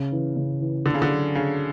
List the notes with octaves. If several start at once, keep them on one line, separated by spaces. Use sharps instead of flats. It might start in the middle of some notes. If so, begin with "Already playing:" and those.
Already playing: C#3
E3
C#3
E3
D3 D4
C#3
D3
F#3
C#3 D4